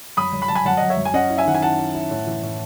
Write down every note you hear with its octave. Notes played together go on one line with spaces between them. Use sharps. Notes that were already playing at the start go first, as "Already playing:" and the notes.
F#2 B5 D#6
F#2
B5
F#2 A5
G#5 B5
F#2 F#5 A5
F#2 D#5 F#5
C#5 E5
F#2
G#5
C#4 D#5 F#5
E4
E5 G#5
D#3 F#5
G#5
E4 F#5 A5
E4
E4
A2
E3
A2